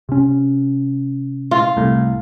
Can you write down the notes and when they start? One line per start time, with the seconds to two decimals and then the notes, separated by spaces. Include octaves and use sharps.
0.09 C3 C#4
1.51 F4
1.77 C2 A2